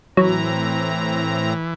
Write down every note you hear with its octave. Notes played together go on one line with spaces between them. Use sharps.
A2 E3 F#3 C4 A#5